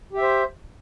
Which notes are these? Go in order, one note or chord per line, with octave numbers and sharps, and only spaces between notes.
G4 C5 E5